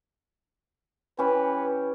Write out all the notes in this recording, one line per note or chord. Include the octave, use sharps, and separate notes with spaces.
E3 C#4 G4 B4